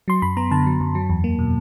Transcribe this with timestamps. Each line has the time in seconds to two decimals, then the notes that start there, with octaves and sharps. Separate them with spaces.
0.08 F#3 C6
0.22 F#2 B5
0.37 B3 A#5
0.51 D3 A5
0.66 F#3
0.81 F#2
0.95 F#3
1.10 E2
1.24 A#3
1.39 B2